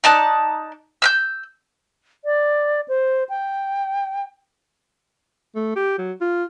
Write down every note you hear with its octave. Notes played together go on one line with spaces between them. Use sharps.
D#4 D5 A5 F#6
E6 F6 G6
D5
C5
G5
A3
G4
F#3
F4